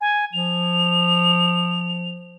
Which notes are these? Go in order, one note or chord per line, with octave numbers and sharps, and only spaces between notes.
G#5
F3 F7